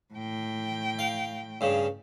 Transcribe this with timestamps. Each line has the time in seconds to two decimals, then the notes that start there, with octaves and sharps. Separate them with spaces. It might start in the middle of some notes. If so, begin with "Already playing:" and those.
0.14 A2 G5
0.99 F5
1.61 G2 C#3